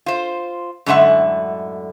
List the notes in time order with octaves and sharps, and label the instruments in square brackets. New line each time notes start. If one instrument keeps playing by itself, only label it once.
[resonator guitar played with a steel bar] F4 C5
F#2 A2 D3 G#3 E5 F#5